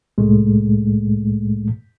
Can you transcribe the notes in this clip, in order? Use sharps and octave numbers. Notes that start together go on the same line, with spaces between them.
C2 A2 G#3 A3